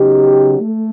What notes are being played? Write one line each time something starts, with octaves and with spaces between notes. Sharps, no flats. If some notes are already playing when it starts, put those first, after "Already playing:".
Already playing: C#3 F#3 B3 D#4 G4
A3